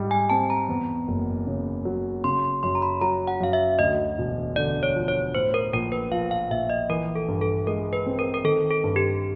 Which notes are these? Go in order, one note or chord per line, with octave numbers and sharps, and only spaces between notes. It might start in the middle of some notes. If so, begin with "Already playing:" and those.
Already playing: G#2 G3
G#5
C4 A5
A#5
E2
F#1
C#3
F#3
C#3 C6
C6
F#2 C6
A#5
B5
F#3 A#5
F#5
F#2 F5
E5
D2 D#5
E1
D3 D5
C#5
F3
C#5
A2 C5
A#4
A#1 A#4
B4
F3 F5
F5
A#1 E5
D#5
E3 A#4
A4
G2
A4
G#3 A#4
B4
C4
A#4
A#4
D#3 A4
A4
G2
G4